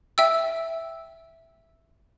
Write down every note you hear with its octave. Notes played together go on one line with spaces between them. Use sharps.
E5 G5 E6